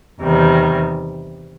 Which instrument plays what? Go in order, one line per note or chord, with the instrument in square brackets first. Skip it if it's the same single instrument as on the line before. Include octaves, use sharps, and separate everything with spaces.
[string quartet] E2 C3 D#3 G3